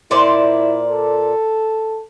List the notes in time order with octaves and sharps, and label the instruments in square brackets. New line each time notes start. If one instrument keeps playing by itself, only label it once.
[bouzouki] A#2 C5 D5 [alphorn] E4
[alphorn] A4